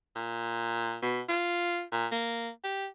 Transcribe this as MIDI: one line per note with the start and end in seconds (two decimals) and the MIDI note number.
0.16 0.96 46
1.02 1.21 47
1.29 1.82 65
1.92 2.07 46
2.12 2.49 58
2.64 2.87 67